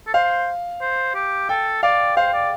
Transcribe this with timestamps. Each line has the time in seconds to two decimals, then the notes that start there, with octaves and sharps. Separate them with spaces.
0.07 A4
0.14 C5 F5
0.81 C5
1.15 G4
1.49 A4 G5
1.83 D5 F5
2.17 C5 F5
2.33 D5